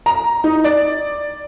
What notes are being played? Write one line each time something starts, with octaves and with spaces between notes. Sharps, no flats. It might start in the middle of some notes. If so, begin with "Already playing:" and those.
A#5
D#4
D5